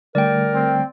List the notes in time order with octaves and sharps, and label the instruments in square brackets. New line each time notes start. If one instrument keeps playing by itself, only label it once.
[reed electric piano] D3 G3 A3 [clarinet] A#4 [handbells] D5 G5
[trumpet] C4